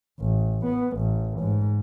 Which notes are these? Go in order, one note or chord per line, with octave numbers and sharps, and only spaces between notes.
A1
B3
A1
G#2